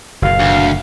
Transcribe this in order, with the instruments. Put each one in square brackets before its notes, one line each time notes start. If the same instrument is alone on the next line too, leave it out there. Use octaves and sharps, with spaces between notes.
[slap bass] F#1 B2 [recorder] F5
[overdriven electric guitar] D2